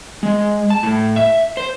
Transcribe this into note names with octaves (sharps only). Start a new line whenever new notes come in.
G#3
A5
A2
E5
C5